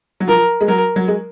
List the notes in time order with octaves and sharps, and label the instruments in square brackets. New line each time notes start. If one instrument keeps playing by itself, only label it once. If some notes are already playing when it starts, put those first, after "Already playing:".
[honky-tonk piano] F#3
[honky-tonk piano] F3 [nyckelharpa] A#4
[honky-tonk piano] G#3
[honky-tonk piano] F#3 [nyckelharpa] A#4
[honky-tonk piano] F#3
G#3